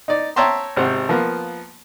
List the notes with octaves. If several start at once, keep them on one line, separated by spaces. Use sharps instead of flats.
D#4 D5
C#5 E5 G5 A5 A#5 C6
G#1 C3 C5 F#5
F3 A#3 B3